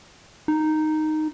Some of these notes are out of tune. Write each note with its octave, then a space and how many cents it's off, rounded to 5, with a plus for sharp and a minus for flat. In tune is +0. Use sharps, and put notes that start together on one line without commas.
D#4 -5